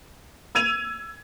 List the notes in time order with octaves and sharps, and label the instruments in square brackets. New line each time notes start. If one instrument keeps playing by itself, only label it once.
[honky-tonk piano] E6 G#6 D#7 F7